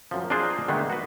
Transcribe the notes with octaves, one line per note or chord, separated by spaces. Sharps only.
F#2 F3
D4 D#4 F4 G#4 C5 D#5
D3 D#3 G#3 A3 B3
F#4 B4